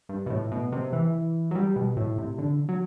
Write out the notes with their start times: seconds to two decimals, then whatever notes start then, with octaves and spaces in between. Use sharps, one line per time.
0.09 G2
0.26 B2
0.30 A2
0.52 B2
0.72 C3
0.93 E3
1.51 F#3
1.55 G3
1.76 B2
1.97 A2
2.18 C3
2.38 D3
2.69 F#3